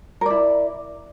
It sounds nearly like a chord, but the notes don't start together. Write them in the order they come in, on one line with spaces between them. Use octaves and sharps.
A#4 D5 E4